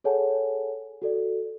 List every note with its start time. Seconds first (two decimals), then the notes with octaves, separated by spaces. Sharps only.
0.04 G#4 A4 C#5 F#5 G#5 A5
1.02 F#4 A4 D5